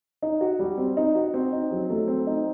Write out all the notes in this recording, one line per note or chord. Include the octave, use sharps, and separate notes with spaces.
D#4
F#4
G3
C4
D#4
F#4
C4
D#4
F#3
A3
C4
D#4